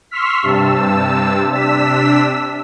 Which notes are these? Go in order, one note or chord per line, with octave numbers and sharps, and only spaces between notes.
C6 C#6 E6 F6 B6
G2 C3 A5 E6
C3 D4 E6 B6